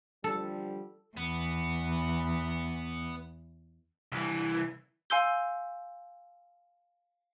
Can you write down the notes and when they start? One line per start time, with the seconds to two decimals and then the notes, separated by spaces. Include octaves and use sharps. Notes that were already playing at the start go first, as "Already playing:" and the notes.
0.24 D3 F3 G3 A4
1.17 E2 B3
4.12 C2 E3
5.10 F5 G#5 C6 E6 G6 G7